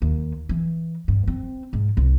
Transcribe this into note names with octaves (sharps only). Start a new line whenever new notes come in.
D#2
E3
G2
C4
G#2
C2